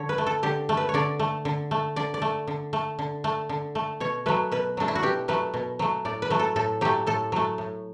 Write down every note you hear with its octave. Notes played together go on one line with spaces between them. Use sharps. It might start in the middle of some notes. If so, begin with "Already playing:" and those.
Already playing: D3 C#5
B4
A3
A4
D3 G4
A3
B4
C#5
D3 D5
A3
D3
A3
D3 D5
D5
A3
D3
A3
D3
A3
D3
A3
B2 C#5
F#3 A3 B4
B2 B4
F#3 A3 D4
E4
F#4
B2 G4
F#3 A3 B4
B2
F#3 A3
A2 D5
B4
F#3 A3
A4
A2 A4
F#3 A3 G4
A2 A4
F#3 A3
A2